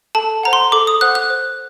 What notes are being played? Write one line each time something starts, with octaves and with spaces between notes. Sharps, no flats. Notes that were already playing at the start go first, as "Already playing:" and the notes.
A4 A5
C5 F#5 A#5
C6
A4 D6
D#6
C5 F#5 F#6
F#6
C5